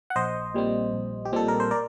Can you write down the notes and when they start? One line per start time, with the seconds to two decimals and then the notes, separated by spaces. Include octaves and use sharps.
0.10 F#5
0.16 A#1 C5 D#5
0.54 A#2 G3 C4
0.93 A#1
1.25 G4
1.33 A#2 G3 C4 A4
1.48 A#4
1.60 C5
1.71 A#4 D5